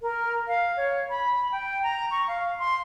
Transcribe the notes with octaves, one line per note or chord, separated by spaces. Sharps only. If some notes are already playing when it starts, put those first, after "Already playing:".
A#4
F5
C#5
B5
G5
A#5
C#6
F5
C6